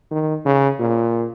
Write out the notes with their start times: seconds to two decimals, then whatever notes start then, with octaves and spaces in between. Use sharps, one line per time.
0.11 D#3
0.45 C#3
0.79 A#2